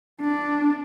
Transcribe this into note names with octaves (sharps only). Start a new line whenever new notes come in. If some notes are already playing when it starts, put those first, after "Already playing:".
D4